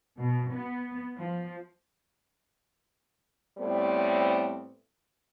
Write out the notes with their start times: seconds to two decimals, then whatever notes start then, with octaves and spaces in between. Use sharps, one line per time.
0.18 B2
0.53 B3
1.17 F3
3.58 A2 G3 A3 B3 C4